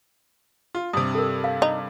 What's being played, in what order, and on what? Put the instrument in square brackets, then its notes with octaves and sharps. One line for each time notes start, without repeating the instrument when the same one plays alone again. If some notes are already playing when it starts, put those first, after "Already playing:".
[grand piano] F4
[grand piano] G2 C3 [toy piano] D#6
[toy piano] A4 A#4
F5
[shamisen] D#4